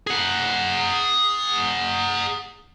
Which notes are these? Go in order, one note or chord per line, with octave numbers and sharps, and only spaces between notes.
G#4 F#5